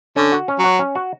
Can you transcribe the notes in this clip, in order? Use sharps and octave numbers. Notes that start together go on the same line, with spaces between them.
D3 C#4
F#4
C#4
F#3 F#4
C#4
F#4